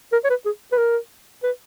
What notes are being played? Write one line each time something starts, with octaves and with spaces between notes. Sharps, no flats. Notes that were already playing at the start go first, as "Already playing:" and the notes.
A#4
C#5
B4
G#4
B4
A#4
B4